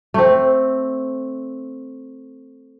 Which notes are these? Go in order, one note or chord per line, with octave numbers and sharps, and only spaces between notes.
A3 C4